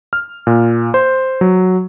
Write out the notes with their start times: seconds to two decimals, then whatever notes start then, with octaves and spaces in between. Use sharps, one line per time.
0.13 F6
0.47 A#2
0.94 C5
1.41 F#3